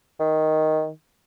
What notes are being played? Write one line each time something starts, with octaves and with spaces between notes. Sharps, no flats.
D#3